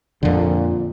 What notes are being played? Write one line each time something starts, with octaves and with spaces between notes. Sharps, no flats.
F2 A#2 D3